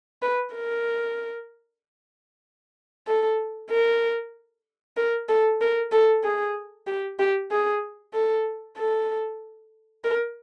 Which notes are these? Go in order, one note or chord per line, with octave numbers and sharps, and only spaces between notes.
B4
A#4
A4
A#4
A#4
A4
A#4
A4
G#4
G4
G4
G#4
A4
A4
A#4